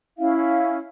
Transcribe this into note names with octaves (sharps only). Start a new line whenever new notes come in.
C#4 E4 E5 F5